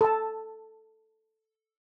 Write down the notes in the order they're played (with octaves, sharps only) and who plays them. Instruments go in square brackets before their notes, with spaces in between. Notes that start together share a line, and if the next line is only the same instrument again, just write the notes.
[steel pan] A4 A5